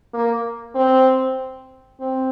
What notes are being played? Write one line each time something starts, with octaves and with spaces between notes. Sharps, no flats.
A#3
C4
C4